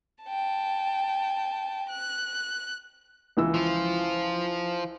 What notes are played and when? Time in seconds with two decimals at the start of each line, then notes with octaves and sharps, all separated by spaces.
0.25 G5 A5
1.89 F#6
3.37 C#2 E3 E6
3.54 F3 F4